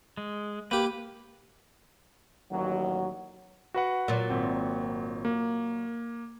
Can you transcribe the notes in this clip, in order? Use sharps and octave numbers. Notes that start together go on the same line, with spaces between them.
G#3
A#3 G4 B4
A1 D#2 F#3
F#4 B4 F#5
A#2 F#3
G#1 C4 F#5
A#3